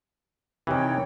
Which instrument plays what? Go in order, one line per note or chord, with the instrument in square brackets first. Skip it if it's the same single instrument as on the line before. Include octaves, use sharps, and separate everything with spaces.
[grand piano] C3 G4 B4 [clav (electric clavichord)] D#3 E3 [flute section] C#5 G5